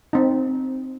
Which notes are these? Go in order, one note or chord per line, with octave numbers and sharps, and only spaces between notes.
C4 D#4